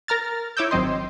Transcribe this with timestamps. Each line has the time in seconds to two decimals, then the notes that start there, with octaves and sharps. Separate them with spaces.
0.08 A#4 A#5 F6 A6
0.57 E4 C#5 D6 E6 G6
0.71 G#1 F#3 C4 D#5 C6